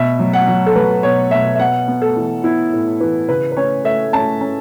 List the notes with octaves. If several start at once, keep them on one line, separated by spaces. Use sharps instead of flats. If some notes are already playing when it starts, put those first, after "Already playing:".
Already playing: B2 E5
F#3
F#5
F#3
A4
F#3 B4
B2 C#5
B2 E5
E5
B3 F#5
B3
A4
E3
B3 E4
A2
E3 B4
C#3 B4
B4
C#4 C#5
A3 E5
C#4 A5
C#4